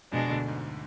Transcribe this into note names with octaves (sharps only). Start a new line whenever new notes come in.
F2 B2 F3 G#3 D4
D2 D3
G#2